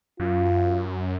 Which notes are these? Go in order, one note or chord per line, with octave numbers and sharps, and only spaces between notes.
F#2 F4